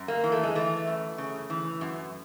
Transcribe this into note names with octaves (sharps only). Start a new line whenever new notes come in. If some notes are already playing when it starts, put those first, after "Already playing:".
Already playing: F#2
A#3
E3
A3
G#3
E3 A3
F#2
C#3
E3
F#2